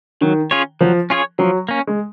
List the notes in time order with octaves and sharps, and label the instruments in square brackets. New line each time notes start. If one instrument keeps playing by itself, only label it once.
[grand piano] D#3 [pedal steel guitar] F#3
[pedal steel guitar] C#4 F4 G#4 C#5
[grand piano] F3 [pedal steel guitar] F#3
[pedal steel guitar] C#4 F4 G#4 C#5
[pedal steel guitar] F3 [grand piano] F#3
[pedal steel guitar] A#3 C#4
[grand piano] G#3